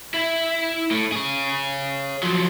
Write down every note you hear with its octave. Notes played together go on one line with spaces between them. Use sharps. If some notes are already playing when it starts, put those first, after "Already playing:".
E4
A2
G#4 C#5
F3 F#3